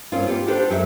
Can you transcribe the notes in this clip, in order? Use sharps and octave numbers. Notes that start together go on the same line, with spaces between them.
G2 A#3 C4 C#4 F4
F4 G4 F#5
D4 F#4 G4 A4 B4 C5
F#2 F#3 G#4 E5